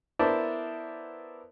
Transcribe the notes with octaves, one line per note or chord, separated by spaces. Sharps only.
B3 E4 A#4 C5 D5 A5